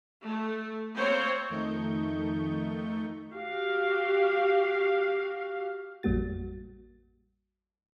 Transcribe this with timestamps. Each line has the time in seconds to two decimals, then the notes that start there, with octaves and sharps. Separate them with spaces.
0.24 A3
0.94 A#3 C4 C5 C#5
1.49 F2 D#3 A3 D#4 C#6 G6
3.31 F#4 G4 F5
6.03 A1 F2 G3 A#3 F#4 A6